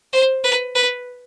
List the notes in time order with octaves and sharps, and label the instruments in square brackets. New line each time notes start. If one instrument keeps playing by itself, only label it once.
[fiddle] C5
B4
B4